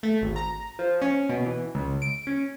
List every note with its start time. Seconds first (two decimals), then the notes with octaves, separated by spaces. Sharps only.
0.03 A3
0.22 G#1
0.36 A#5
0.79 F3
1.02 C#4
1.29 B2
1.46 E3
1.75 C#2
2.02 D7
2.27 C#4